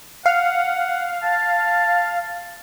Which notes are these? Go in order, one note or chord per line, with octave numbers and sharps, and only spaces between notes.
F5 F#5
A5